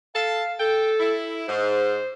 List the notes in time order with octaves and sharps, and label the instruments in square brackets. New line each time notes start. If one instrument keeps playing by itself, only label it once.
[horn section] A4 A5 [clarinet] F5
[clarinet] A4 [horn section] G5
[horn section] E4
[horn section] G#2 [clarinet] C5